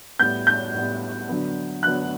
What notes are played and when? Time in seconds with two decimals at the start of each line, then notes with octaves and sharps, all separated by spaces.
0.19 A2 G3 B3 G6
0.47 G6
0.74 A2 G3 B3
1.29 D3 F#3 B3
1.83 D3 F#3 B3 F#6